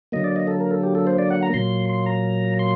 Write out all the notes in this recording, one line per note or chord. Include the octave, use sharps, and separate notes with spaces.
D3 F#3 A#3 D#5
D5
D#5
A4
A#4
A4
G4
A4
C5
D5
F#5
A#5
A#2 F#3 A#3 C6
C6
A#5
C6